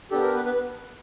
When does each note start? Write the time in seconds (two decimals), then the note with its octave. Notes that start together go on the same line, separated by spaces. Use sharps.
0.11 B3 D4 G4 A4
0.22 A#4
0.34 B3 B4
0.45 B3 B4